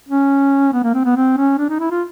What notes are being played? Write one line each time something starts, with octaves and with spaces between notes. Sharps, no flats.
C#4
B3
A#3
C4
B3
C4
C#4
D4
D#4
E4
F4